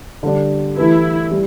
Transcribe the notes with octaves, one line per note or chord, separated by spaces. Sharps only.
D3 G3 D4
E3 A3 E4 G4 B4
G3